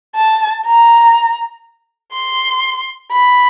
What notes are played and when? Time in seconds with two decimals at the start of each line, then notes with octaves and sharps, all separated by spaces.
0.16 A5
0.66 A#5
2.13 C6
3.12 B5